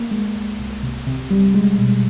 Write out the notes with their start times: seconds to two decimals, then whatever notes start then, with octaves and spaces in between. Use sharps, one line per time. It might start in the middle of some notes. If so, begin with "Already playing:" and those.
Already playing: A#3
0.11 G#3
0.35 C2
0.59 C2
0.83 C3
1.07 C3
1.31 G3
1.54 G#3
1.78 B2